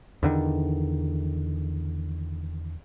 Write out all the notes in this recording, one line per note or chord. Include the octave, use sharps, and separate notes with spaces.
E2 D3 D#3